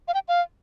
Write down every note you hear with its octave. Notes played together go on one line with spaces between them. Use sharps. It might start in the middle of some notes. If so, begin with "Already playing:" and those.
F5
G5
F5